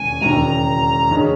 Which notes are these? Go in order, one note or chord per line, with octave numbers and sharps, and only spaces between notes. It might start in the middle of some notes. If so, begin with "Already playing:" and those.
Already playing: E1 D#2 C#3 G#5
E1 D#2 C#3 A#5
C#3 G#3 C#4 G#4